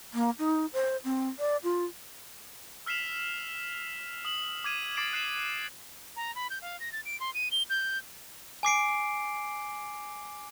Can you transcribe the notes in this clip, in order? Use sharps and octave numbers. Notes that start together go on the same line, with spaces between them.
A#3
D#4
C5
C4
D5
F4
E6 F6 B6 C7 E7 F7
D#6 F#7
D6 G#6 D#7 E7
D6 A6 C7 D7 E7 F#7
F#6 C7 E7 F#7
A#5
B5
G6
F5
A#6
A6
D7
C6
D#7
G7
G6
G#5 D6 C7 D7